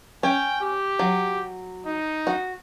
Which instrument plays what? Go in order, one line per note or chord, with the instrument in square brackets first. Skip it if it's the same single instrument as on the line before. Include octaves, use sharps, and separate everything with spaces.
[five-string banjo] C#4 [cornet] G5
[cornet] G4
[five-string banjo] F#3
[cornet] D#4
[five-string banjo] F#4